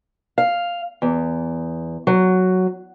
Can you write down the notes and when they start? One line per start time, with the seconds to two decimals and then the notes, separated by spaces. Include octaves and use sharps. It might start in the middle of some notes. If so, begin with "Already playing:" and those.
0.38 F5
1.02 E2
2.07 F#3